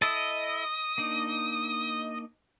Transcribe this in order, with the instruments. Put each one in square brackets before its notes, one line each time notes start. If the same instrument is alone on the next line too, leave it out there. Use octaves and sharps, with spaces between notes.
[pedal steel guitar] E4 A4 A5 [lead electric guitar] D#5
[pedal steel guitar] A#3 D4 D#4